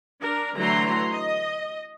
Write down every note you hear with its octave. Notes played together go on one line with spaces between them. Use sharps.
D4 A#4
D3 E3 F#3 A3 A#5 C6
D#5